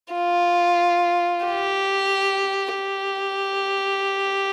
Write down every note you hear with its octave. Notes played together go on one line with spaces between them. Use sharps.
F4
G4
G4